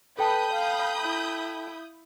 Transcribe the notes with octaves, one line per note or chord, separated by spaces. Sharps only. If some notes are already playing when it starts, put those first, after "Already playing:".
A4 B4 G5 A5 B5 D#6 G6
F5
E4